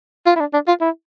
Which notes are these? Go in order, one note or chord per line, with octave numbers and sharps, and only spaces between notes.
F4
E4
D4
D4
F4
E4